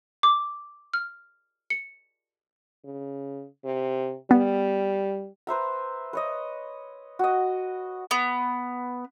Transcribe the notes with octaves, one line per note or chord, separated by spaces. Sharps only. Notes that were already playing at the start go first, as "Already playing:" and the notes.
D6
F6
C#7
C#3
C3
G3 B3
B4 C5 E5 A#5
B4 C#5 D#5
F#4 D#5
B3